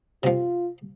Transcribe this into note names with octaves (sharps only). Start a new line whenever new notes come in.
C3 F3 F4